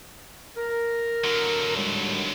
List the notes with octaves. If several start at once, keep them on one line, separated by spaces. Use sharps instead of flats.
A#4
D3 F#3
D#2 G3 G#3